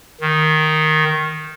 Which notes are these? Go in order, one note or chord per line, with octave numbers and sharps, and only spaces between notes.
D#3